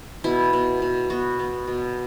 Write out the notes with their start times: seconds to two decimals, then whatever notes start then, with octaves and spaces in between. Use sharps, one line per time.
0.24 B2 E4
0.53 B2
0.82 B2
1.10 B3 F#4
1.39 B3
1.67 B2